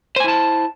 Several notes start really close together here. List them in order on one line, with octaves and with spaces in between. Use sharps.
C5 G#5 E4 A5